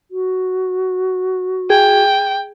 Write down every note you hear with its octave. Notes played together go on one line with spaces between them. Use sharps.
F#4
G#4 G5